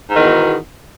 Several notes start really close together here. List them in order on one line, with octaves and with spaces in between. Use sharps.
G#2 D#3 E2 B2